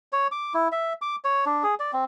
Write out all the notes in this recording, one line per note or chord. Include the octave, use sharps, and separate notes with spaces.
C#5
D6
E4
E5
D6
C#5
D4
G#4
D5
C4